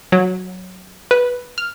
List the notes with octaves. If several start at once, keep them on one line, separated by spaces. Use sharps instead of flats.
F#3
B4
F6